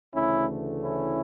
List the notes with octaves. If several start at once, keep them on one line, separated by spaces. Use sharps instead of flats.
D2 C#3 E3 A3 C#4 E4
C#4 E4